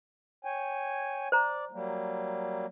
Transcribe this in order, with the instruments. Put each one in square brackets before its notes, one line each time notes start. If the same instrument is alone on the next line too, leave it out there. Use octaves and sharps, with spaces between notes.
[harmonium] C#5 G5 G#5
[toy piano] C5 A#5 [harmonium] D5
[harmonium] F#3 G3 A#3